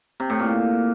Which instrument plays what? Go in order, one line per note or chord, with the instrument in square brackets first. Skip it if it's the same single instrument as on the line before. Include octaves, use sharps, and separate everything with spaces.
[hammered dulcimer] C3
A2
A#2